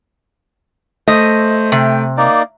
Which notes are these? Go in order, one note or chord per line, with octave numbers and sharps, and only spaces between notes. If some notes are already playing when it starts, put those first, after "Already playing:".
A3 C5 D#5
C3 G5
A#3 D#4 D5